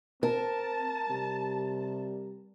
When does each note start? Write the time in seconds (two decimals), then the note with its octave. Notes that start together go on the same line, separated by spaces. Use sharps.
0.23 C4 A#4 A5
1.10 C3 G3